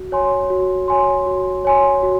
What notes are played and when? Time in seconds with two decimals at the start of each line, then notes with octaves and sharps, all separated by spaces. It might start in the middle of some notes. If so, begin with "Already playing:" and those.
Already playing: F#4
0.12 C#5 G#5 C6
0.50 F#4
0.88 C#5 G#5 C6
1.26 F#4
1.64 C#5 G#5 C6
2.03 F#4